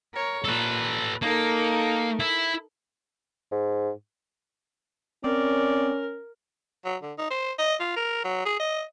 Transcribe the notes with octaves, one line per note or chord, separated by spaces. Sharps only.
A#4 C#5
A#2 A4 B4
A#3 D#4 A4 A#4
E4
G#2
C4 C#4 A#4 D5
F#3
D3
D#4
C5
D#5
F4
A#4
F#3
G#4
D#5